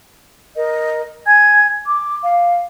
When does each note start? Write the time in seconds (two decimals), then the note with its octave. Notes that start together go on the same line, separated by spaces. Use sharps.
0.55 A#4 D#5
1.26 G#5 G#6
1.86 D6
2.22 F5